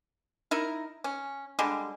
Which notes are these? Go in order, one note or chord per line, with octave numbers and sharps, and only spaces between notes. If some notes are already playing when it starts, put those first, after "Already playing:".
D#4 E4 A#4
C#4
D3 G3 G#3